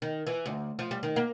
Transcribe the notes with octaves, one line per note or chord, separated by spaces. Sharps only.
D#3
E3
D2
F3
G3
D#3
A#3